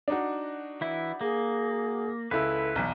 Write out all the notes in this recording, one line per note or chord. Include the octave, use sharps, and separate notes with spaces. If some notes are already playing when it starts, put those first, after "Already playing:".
D4 D#4 F#4
E3 E4
A#3 G#4
C#2 E4 A4 B4
B1 E2